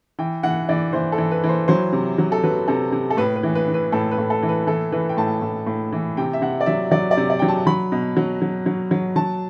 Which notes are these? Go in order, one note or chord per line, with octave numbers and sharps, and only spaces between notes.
E3 G5
E3 F#5
E3 D5
E3 C5
A4
E3
B4
E3
C5
F#3 C5
C3
F#3
A4
F#3 B4
C3 A4
C3
A4
A2 B4
B4
E3
B4
E3
B4
A2 A4
B4
A2
A4
E3
B4
E3 A4
E3 B4
G5
A2 A5
A2
A2
E3
C3 G5
E5
C3 F#5
D5
F#3 E5
F#3 D5
D5
C3
D5
F#3 G5
A5
F#3 B5
B2
F#3
F#3
F#3
F#3
F#3 A5